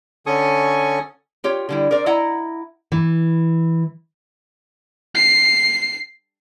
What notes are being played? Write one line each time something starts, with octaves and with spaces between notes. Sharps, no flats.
D3 C#4 A4 G#5 C#6 D#6
F4 G4 C#5
D3 G3 E4
A#4 C5 D5
E4 D#5 E5 F#5 A#5
E3
C7